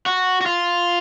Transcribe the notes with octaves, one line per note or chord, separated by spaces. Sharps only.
F#4
F#4
F4